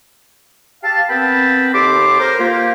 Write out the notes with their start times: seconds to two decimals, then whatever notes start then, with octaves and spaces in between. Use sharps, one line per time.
0.83 G4 F5 A5
1.09 B3 C4 A#4 G5 A5 B5
1.73 D#2 G4 A4 C6 D6
2.19 A#4 C5
2.39 A#3 F4 G4